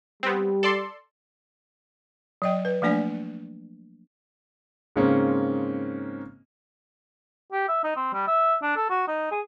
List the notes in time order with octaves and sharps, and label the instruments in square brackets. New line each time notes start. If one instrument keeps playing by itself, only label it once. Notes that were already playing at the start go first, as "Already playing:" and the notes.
[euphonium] G3 [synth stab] B3 C4
[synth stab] A4 D5 C6
[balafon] F#3 D#5 G5
B4
F3 A3 A#3 D4 D5 G#5
[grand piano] G#2 C#3 G#3 A#3 C4 C#4
[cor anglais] G4
E5
D#4
C4
G3
E5
D4
A4
F#4
D#4
G#4